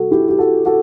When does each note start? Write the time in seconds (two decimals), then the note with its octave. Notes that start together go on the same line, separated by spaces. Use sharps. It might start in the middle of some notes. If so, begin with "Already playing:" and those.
Already playing: C3 G3 F#4 A4
0.11 E4 G4
0.29 G4
0.39 F#4 A4
0.66 F#4 A4